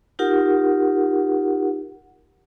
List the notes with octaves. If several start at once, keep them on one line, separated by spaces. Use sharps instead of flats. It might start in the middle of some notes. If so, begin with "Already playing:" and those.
D#4 F4 G4 A#4 F#5